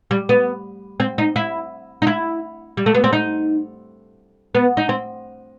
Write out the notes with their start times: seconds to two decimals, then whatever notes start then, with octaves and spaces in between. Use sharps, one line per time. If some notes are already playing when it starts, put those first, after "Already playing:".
0.11 G3
0.29 B3
1.00 C4
1.18 D#4
1.36 E4
2.02 D#4
2.07 E4
2.77 G3
2.86 A3
2.94 B3
3.04 C4
3.13 D#4
4.55 B3
4.77 D#4
4.89 C4